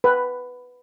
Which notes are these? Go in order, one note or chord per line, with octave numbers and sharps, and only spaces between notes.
B4